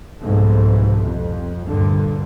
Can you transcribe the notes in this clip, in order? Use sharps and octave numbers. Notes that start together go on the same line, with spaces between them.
C2 G#2 B2 F3 A3
F2
D2 G2 A#2 D3